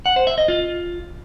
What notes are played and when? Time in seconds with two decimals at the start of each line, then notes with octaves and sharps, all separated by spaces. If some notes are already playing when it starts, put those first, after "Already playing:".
0.06 F#5
0.16 C5
0.27 E5
0.38 D#5
0.48 F4